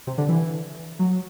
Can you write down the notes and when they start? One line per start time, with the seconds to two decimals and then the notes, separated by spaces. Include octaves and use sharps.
0.07 C3
0.18 D3
0.29 E3
0.99 F#3